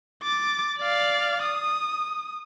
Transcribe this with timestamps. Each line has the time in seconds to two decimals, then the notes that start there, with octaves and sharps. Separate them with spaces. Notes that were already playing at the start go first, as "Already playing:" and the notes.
0.24 D6 A6
0.79 D5 F5
1.43 D#6